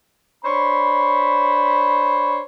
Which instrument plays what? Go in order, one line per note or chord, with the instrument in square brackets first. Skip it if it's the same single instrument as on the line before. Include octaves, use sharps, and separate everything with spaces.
[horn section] D4 C5 C#5 B5